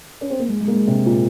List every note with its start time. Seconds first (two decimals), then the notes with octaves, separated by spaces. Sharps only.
0.21 C#4
0.30 C4
0.39 A#3
0.48 G#3
0.61 G#3
0.68 A#3
0.74 G#3
0.87 C3
1.06 A#2